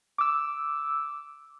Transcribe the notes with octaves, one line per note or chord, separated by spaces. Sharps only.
D6 E6